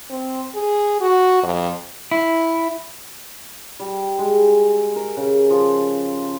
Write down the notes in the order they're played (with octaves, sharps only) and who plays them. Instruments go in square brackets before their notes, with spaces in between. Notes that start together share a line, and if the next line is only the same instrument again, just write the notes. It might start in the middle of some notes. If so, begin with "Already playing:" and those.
[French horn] C4
G#4
F#4
F2
[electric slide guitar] E4
[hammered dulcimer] G3
G#3
A#4
C#3
F3